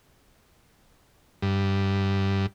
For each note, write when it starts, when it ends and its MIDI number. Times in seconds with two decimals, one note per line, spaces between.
1.42 2.46 43